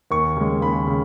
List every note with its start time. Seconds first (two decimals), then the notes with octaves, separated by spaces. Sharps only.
0.11 D#2 C#6
0.37 C#3 G#3
0.62 D#2 B5
0.87 C#3